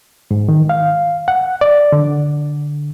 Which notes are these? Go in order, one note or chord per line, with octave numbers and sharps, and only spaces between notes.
G#2
D#3
F5
F#5
D5
D3